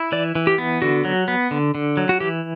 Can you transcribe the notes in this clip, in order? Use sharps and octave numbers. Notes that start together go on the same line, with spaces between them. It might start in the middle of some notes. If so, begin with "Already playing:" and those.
Already playing: E4
E3 D5
E3
G4
B3
D3 F#4
F#3
B3
D3
D3
F#3
F#4
E3 G4